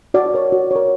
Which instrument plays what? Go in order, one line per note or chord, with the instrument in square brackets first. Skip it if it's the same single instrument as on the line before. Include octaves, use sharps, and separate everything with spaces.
[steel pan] F#4 D5
A#4 C#5
F#4
A#4 C#5